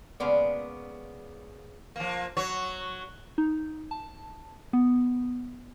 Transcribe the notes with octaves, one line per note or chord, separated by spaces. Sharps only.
C#3 G#3 A#3 B3 D5
F3 A#3
F#3 C#5
D#4
A5
B3